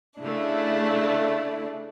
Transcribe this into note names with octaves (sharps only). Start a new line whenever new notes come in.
C#3 A3 D4 E4